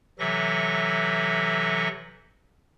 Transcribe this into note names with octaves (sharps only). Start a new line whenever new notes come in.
C3 E3 F#3 A4 E5 A#6